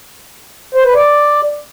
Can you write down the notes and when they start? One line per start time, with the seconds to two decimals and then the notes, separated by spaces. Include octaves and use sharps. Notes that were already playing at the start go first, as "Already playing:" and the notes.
0.75 C5
0.85 B4
0.95 D5